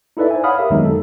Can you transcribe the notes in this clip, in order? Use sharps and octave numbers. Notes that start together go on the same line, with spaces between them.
D#4 E4 A4 B4 D5 E5
C5 G#5
C#5 F5 F#5 B5 D#6 F6
G4 A#4 E5
F2 D#3 F#3 G#3 B3 D#4
D3 A4